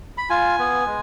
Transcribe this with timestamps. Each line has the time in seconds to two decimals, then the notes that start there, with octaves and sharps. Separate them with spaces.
0.18 B5
0.30 F4 G#5
0.59 B3
0.87 G#3